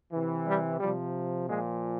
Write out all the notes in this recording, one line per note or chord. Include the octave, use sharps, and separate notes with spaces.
C3 E3
G3
C3 F3 G3
A#2 F3 G#3